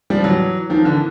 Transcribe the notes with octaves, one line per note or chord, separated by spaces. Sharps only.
F3 G3
E3 F#3
D#3 F3
D3 E3